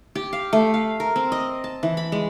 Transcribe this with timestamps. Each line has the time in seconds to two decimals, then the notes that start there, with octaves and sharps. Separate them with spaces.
0.15 G4
0.33 F5
0.53 A3
0.74 F5
1.00 A#4
1.16 C4
1.32 D#5
1.64 A5
1.83 E3
1.97 B5
2.12 G#3